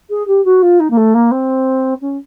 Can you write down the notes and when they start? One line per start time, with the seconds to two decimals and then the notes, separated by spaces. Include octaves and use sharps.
0.09 G#4
0.27 G4
0.44 F#4
0.62 F4
0.79 D#4
0.90 A#3
0.97 A3
1.14 A#3
1.31 C4
2.01 C#4